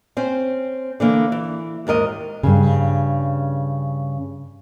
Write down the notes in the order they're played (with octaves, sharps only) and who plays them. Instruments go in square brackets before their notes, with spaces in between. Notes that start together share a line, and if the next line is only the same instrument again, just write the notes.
[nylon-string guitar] C4 C#4 C5
D3 E3 A#3
E3
D#2 G#2 A#4 D#5
G2 C#3